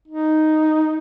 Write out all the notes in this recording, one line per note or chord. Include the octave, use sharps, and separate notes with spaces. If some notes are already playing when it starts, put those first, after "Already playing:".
D#4